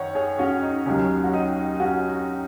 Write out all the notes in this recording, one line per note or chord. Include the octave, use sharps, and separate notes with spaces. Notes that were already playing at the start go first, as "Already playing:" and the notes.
Already playing: F#2 D#3 C#5 F#5
G#4 C#5
C#4 F#4
D#4
D#2 D#3 F#3 C#4
F#4
D#4
C#4 F#4